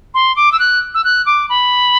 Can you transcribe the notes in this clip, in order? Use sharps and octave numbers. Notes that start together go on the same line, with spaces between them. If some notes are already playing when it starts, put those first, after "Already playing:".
C6
D6
E6
F#6
E6
F#6
D6
B5